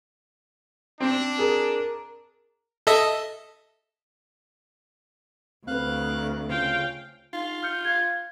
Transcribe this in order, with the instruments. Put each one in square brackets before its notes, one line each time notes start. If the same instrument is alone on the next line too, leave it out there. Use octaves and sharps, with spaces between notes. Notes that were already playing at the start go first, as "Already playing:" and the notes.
[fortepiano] C4 [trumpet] D4
[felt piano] G#4 [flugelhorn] A#4
[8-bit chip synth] A4 D#5 E5
[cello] D2 [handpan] C4 B4 [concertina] F5 F#6
[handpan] C#3 C#4 F4 [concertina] C5 [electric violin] F5 G5
[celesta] D#4 [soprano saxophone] F4
[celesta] F6 G6 C#7
F5 G#6